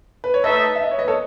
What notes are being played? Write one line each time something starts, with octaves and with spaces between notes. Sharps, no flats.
B4
C#5
A3 D#4 A4 B4 D#5 E5
E5
D#5
C#5
B4 D#5
A4 C#5